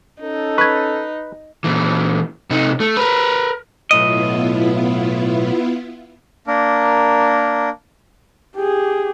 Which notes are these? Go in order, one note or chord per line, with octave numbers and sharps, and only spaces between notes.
C#4 D#4 A4
B4 C#6 G#6
A#2 E3
C3 D#4
A3
A#4 B4
B1 A2 B3 E4 F4 D#5
A#3 D4 A#4
G4 G#4